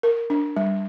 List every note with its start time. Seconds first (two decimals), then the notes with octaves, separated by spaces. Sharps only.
0.03 A#4
0.30 D4
0.57 G3